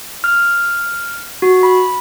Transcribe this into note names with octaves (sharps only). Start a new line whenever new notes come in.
F6
F#4
B5